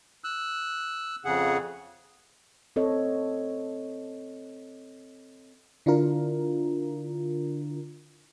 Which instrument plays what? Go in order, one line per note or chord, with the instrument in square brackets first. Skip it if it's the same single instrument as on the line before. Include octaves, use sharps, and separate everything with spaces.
[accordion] E6 F#6
F2 C#3 G#4 F#5
[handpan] C4 A4 C#5 D#5
[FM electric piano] D3 D4 E4 F4 A#4